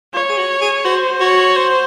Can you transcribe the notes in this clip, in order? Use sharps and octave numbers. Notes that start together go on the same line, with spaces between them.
F4 C#5
G#4
F#4
G#4
F#4 C5
F#4 C#5
C5